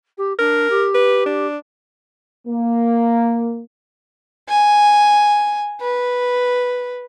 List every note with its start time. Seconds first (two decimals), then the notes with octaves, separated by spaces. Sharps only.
0.17 G4
0.39 D4 A#4
0.70 G4
0.94 B4
1.26 D4
2.47 A#3
4.49 G#5
5.81 B4